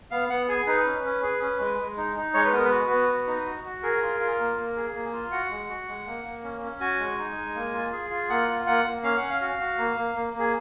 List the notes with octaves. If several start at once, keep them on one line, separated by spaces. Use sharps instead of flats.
B3 F5
B3 F#5
G#4 G#5
D#4 B4
C#4
C#4
G#4
C#4
G#3
G#3
D#4
D#4
G#3 C#5
B4
B3 A#4
B4
F#4
B3
F#4
D#4
F#4
F#4
G#4 A#4
F4
F4
A#3
A#3
G#4
A#3
F4
F#4 F#5
G#3
F#4
G#3
A#3
A#3
C#4
C#4
F#4 G#5
G#3
D#4
G#3
A#3
F4
G#4
F4
A#3 F#5
F4
A#3 F#5
A#3
C#4 F5
F#5
C#4
F5
F#4
F#4
A#3
A#3
A#3
A#3
G#4